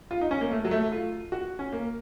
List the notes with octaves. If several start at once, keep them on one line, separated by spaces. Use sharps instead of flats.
F4
D#4
C#4
A#3
A3
F#3
A3
F4
F#4
C#4
A#3